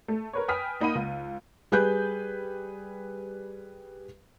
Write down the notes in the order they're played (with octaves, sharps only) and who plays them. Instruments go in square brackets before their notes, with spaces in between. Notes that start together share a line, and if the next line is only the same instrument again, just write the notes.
[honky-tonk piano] A3
A#4 B4 C#5
B4 G5 G#5 D#6 F6 B6
A#3 D#4 F#5 B5 D#7
C#2
[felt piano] G3 G#4 B4 F#6 G6